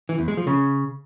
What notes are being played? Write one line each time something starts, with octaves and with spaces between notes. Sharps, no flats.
E3
E2
G#3
F3
C#3